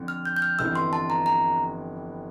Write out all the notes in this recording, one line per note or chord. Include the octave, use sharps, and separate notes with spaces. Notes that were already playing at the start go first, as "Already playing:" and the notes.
Already playing: F2 D3
F6
G6
G6
F6
G1 F2 E3 E6
C6
A5
A#5
A#5